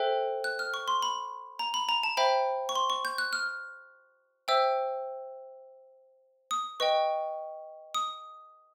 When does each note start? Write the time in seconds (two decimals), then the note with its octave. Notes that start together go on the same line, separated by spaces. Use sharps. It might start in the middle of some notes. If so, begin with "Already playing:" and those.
Already playing: A4 C5 E5 G5 F#6
0.44 F#6
0.59 F6
0.74 C#6
0.88 C6
1.02 B5
1.59 A#5
1.74 B5
1.89 A#5
2.03 A5
2.17 C5 E5 G5 B5
2.69 C#6
2.75 C6
2.90 C#6
3.05 G6
3.18 F#6
3.33 F6
4.48 C5 E5 G5 E6
6.51 D#6
6.80 B4 D#5 G5 C#6
7.95 D#6